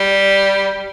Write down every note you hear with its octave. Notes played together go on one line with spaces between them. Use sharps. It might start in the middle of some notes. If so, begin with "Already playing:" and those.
Already playing: G3